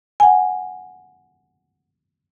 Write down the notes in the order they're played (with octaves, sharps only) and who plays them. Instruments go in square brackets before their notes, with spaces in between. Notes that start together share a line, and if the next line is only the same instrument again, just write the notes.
[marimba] F#5 G#5